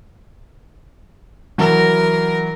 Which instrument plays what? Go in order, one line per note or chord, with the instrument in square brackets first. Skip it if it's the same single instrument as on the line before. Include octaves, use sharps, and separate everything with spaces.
[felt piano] E3 F#3 [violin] A#4